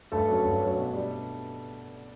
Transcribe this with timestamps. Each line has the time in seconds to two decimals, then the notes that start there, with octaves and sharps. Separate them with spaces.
0.12 G2 A3 A4
0.28 F#3 C#4
0.45 G2
0.61 F#3 C#4
0.77 B2
0.93 G3 D4